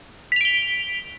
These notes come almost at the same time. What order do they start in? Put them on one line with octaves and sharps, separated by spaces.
B6 F7 D7 G7